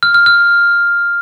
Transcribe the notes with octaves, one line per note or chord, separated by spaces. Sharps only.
F6
F6
F6